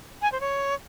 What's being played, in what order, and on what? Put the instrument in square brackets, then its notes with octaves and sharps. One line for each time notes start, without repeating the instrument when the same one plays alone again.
[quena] G#5
C5
C#5